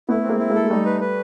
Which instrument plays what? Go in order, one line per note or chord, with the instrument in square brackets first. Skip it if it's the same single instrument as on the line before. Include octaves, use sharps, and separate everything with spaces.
[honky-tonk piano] A3 B3 [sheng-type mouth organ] E4
[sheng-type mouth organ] C4
[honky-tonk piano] G#3 A#3
[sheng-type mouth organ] E4
[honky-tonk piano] G#3 A#3
[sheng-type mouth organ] A4
[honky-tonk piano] G#3
[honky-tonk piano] G3 A3 [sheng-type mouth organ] D#4
[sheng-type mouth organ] B4
B4